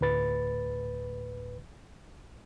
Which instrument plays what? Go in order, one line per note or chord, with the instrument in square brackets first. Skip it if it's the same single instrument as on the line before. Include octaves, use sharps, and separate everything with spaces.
[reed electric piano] D2 A2 B4 A6